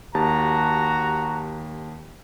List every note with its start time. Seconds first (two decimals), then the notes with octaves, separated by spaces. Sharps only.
0.15 D#2 F#4 G4 A5 A#5